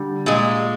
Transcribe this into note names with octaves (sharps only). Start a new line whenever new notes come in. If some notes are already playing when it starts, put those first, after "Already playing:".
Already playing: D3 G3
A#2 G#3